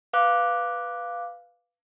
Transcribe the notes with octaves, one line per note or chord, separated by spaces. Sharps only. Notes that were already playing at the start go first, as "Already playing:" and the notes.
B4 F5 D6 F#6